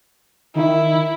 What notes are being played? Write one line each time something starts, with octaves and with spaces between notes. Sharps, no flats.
D#3 E4